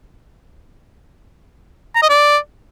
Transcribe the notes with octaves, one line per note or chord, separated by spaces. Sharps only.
A#5
D#5
D5